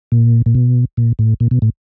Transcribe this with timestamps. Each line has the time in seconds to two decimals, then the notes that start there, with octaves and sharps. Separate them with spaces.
0.12 A#2
0.46 A#2
0.55 B2
0.97 A#2
1.19 A2
1.40 A#2
1.51 B2
1.62 A2